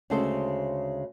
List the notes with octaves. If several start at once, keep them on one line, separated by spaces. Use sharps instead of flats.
D2 C#3 G#3 G#4 A4 C5